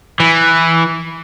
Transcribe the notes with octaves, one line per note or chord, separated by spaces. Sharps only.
E3